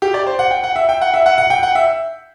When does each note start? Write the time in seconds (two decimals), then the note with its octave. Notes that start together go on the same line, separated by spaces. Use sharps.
0.02 G4
0.14 D5
0.26 C5
0.39 F#5
0.51 G5
0.63 F#5
0.76 E5
0.89 G5
1.01 F#5
1.14 E5
1.26 F#5
1.38 F#5
1.50 G5
1.63 F#5
1.75 E5